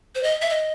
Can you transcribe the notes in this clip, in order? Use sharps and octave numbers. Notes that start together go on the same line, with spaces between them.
C5
D#5
E5
D#5